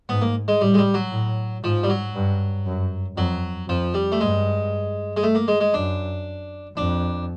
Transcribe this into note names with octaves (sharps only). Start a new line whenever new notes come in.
G#2 B3
A#3
G#3
A2 G3
G#3
G3
F#3
A2
G#2 F3
G3
F#3
G2
F#2
F2 F#3
F2 F3
G3
A3
G2 G#3
G#3
A3
A#3
G#3
G#3
F#2 D4
F2 D4